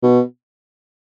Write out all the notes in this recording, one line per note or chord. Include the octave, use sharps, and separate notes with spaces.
B2